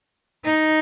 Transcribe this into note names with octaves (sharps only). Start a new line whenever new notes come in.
D#4